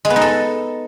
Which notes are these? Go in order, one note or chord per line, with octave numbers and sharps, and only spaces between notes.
G#3
B3
D#4
A4